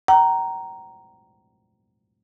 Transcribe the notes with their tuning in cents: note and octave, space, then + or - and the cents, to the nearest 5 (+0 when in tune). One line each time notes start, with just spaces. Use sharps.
G5 -45 A#5 +0